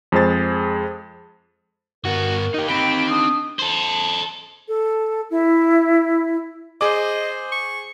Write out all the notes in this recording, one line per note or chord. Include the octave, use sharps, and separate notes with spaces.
F2 G#3 G#4 C5 A6
G2 B3 F#4 A#4
D#4 G4
C4 G5 B5 D7
D4 D#6
A4 C5
A4
E4
G#4 C5 D#5 D6
C#6